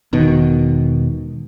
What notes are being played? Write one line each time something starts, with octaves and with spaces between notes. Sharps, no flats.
E1 B2 D#3